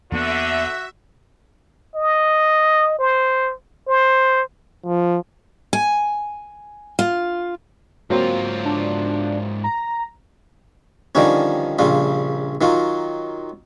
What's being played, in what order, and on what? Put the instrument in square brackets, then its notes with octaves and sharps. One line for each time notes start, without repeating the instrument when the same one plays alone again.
[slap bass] E2 A#3 B3 [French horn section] D3 [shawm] F#4 [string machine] E5
[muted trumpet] D#5
C5
C5
[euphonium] F3
[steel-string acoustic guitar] G#5
F4
[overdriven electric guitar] G#2 F4 [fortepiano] F#3 A#3 C4
[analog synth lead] D4
A#5
[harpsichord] D3 D#3 F3 G3 C#4
A#1 C#3 G3 F4
D#3 F#3 F4